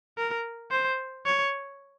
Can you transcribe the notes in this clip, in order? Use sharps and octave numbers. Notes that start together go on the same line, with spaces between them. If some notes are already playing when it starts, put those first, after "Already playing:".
A#4
C5
C#5